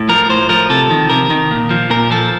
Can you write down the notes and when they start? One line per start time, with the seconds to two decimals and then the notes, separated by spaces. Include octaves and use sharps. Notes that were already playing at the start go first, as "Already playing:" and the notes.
Already playing: A2
0.09 F3 A#4
0.30 A2 C5
0.49 F3 A#4
0.70 C3 A4
0.90 D#3
1.10 C3 A#4
1.30 D#3
1.51 A#2
1.70 F3
1.90 A#2 A#4
2.11 F3 A4